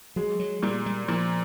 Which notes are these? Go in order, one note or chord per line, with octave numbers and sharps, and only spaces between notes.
F#3 G#3
F#3
A#2 G3
G3
A#2 F3